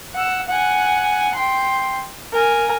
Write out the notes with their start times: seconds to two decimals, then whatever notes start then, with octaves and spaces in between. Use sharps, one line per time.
0.15 F#5 E6
0.48 F#5 G#5
1.35 G5 C6
2.32 A#4 G#5